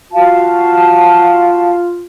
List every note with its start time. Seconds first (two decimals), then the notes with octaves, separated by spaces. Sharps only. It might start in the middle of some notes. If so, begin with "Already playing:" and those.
0.13 F4 F#4 F5 A5